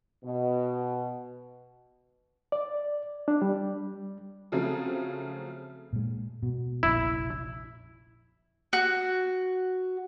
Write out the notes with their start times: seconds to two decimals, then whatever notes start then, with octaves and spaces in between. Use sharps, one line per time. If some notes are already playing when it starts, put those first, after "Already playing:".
0.25 B2
2.52 D5
3.28 D4
3.42 G3
4.52 C#3 F3 F#3 A3 C4
5.93 A#2 G#3
6.43 B2
6.83 F1 A#1 E4
8.73 F#4